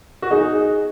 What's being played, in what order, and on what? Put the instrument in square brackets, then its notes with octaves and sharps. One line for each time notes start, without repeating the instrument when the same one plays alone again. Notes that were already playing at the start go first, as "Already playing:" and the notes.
[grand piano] F#4
[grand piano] D#4 [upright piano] G#4